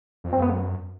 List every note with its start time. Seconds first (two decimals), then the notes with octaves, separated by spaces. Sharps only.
0.24 F2
0.32 F#2 C4
0.42 B3